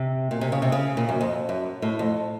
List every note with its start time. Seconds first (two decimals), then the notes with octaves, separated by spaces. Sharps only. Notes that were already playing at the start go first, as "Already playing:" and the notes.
Already playing: C3
0.31 A#2
0.41 C3
0.52 C#3
0.62 C3
0.72 C#3
0.97 A#2
1.09 F#2
1.21 F2
1.49 F#2
1.82 A2
1.99 F2